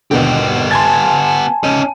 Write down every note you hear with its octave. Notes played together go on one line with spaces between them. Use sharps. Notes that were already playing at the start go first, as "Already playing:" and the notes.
D#2 B2 D3 B3 G4
G#5 A5 C6 G#6 A6
C#4 D#4 D#7